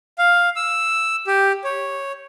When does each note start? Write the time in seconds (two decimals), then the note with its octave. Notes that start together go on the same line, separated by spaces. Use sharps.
0.18 F5
0.56 E6
1.27 G4
1.64 C#5